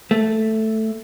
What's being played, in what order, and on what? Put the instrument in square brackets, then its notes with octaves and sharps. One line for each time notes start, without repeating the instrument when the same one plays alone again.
[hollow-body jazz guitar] A3